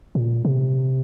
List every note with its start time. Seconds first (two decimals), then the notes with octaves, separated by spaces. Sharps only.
0.15 A#2
0.45 C3